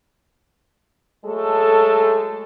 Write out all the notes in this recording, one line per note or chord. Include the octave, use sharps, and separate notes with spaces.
F#3 G#3 A3 A4